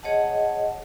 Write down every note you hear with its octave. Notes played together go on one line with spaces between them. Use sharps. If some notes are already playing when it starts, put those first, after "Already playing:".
G#4 C#5 D#5 F#5 A5